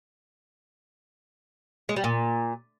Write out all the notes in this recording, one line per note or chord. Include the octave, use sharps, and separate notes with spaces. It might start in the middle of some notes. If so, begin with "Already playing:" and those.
G#3
G3
A#2